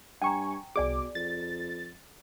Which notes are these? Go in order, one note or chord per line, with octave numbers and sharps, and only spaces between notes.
G2 G5 G#5 A#5 C#6
C2 B2 G#4 D5 G#5 D6
F2 A6